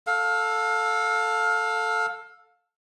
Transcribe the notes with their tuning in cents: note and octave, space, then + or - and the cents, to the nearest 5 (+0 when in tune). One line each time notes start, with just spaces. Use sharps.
A4 +5 F5 +25